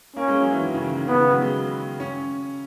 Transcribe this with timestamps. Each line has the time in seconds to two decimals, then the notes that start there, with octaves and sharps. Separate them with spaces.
0.16 A#3 C#4
0.28 G#3
0.40 F#3
0.51 E3
0.62 D#3
0.74 C#3
0.85 D#3
0.96 D#3
1.08 C#3 B3
1.20 D#3
1.31 F#3
1.42 G#3
2.00 C#4